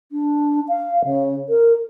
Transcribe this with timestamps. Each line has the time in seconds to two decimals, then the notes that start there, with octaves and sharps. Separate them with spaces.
0.12 D4
0.68 F5
1.04 C#3
1.49 A#4